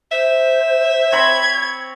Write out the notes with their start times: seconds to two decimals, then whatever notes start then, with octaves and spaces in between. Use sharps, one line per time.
0.12 C5 E5
1.12 C4 C#5 B5 G#6